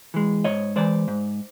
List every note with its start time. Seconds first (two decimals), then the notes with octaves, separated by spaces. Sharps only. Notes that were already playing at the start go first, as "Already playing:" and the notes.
0.14 E3 G#3
0.44 G#2 C#5 D#5
0.76 E3 G#3 C5 D5
1.08 G#2